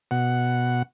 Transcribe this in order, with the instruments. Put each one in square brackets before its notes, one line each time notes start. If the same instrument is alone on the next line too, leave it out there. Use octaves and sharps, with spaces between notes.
[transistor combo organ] B2 F#5